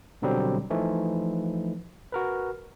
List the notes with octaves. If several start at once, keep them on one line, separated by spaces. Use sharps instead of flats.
B2 D3 F#3 G3 C4
E3 F3 A3 D#4
F#4 A#4 B4